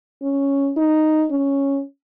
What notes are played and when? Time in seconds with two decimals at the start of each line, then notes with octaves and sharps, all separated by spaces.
0.22 C#4
0.77 D#4
1.31 C#4